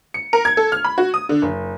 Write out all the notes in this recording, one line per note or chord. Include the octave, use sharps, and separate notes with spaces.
C#7
A#4
G#6
A4
F6
B5
F#4
D#6
D3
F#1